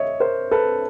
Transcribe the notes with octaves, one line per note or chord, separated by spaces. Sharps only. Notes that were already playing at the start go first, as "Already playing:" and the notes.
Already playing: C#5 D#5 E5
A#4 C5
A4 B4